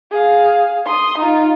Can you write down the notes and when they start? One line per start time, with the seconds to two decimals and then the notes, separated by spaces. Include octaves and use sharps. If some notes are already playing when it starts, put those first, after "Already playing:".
0.11 G#4 F5
0.86 C6 D#6
1.18 D#4 F4